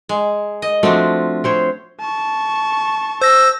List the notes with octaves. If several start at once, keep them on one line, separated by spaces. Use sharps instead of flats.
G#3
D#5
F3 A3 C4 D4 F#4
C4 C5 C#5
A5 C#6
C5 E6 A#6